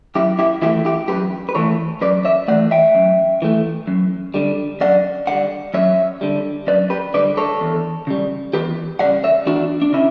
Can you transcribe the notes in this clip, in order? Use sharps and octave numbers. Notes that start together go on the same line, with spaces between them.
F#2 E4 G4
E4 G4
E3 A3 E4 G4
E4 G4
F#2 G4 B4
B4
E3 A3 A4 C#5
F#2 B4 D5
C#5 E5
E3 A3 D5 F#5
E5 G5
F#2
E3 A3
F#2
D3 G3
F#2 D5 F#5
D3 G3 D5 F#5
F#2 C#5 E5
D3 G3
F#2 B4 D5
G4 B4
D3 G3 B4 D5
A4 C#5
E2
C#3 G3
E2 G4 B4
C#3 G3 D5 F#5
C#5 E5
E2 D4 F#4
D4
C#3 C#4 E4